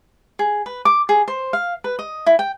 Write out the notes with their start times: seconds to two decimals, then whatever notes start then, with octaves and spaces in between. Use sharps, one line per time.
0.39 G#4
0.66 B4
0.85 D6
1.09 G#4
1.28 C5
1.53 F5
1.84 B4
1.99 D#5
2.26 E4
2.39 G5